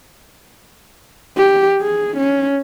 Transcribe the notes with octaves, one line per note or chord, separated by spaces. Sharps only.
G4
G#4
C#4